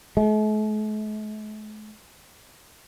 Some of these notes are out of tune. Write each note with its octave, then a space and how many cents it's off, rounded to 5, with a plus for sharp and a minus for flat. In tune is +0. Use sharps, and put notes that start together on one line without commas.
A3 -45